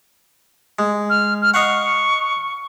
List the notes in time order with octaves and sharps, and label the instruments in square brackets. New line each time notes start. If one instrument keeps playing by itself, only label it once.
[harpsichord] G#3
[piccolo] F6
F6
[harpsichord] D#5 F5 F#5 [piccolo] C#6